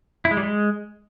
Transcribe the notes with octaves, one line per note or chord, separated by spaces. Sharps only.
E4
G#3
G3
G#3